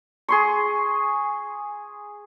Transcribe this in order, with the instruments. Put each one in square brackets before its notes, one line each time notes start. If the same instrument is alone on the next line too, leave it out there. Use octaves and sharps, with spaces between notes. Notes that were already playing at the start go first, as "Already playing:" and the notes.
[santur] G#4 C6 C#6